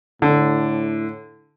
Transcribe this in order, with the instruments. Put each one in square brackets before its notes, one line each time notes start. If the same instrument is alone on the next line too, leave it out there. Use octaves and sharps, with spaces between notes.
[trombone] A2 [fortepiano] D3